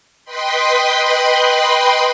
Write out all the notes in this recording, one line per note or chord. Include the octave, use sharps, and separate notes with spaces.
B4 D#5 G5 B5 C6